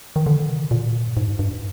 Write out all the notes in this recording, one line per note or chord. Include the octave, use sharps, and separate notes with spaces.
D#3
D3
C3
A#2
G2
G#2
G2
G2